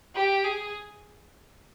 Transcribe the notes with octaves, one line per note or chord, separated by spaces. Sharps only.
G4
G#4